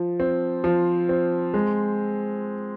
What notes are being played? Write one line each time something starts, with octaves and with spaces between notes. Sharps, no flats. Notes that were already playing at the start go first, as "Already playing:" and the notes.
Already playing: F3
C4
F3
C4
G#3